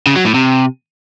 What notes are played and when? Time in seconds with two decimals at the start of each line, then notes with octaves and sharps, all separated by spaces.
0.07 C#3
0.16 F#3
0.25 A2
0.34 C3